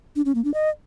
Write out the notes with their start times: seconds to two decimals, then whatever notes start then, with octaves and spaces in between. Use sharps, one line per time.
0.16 D4
0.25 C#4
0.35 A#3
0.44 D4
0.54 D#5